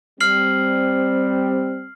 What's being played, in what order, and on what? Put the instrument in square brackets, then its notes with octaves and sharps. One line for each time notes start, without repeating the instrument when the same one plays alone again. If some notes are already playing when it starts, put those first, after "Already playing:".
[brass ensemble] G3 C4 [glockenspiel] F6 C7 F#7